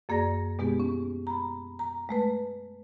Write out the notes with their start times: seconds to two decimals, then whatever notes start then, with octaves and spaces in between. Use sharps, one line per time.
0.09 F#2 A#3 G#4 D5 A#6
0.59 B2 G#3 B3 E4 G4 G#4
0.80 C#4
1.27 A#5 B5
1.79 A#5
2.09 G#3 A3 B4